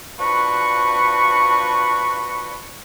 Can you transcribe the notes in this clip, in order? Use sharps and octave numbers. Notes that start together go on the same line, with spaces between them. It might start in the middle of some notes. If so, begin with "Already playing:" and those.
F3 D4 F#4 B4 C#6